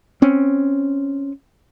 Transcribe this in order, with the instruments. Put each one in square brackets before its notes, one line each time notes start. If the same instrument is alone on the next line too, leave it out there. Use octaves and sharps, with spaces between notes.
[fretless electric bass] C4 C#4